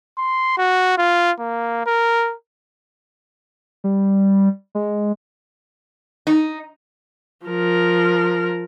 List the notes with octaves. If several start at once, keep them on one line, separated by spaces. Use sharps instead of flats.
C6
F#4
F4
A#3
A#4
G3
G#3
D#4
F3 A#4